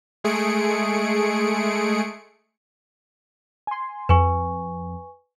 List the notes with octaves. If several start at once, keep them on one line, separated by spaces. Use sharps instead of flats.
G#3 A3 G#4 C#7 D7
G#5 C6
F2 B4 G#5 C#6